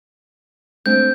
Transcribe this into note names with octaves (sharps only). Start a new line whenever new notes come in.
A3 C4 D4 G6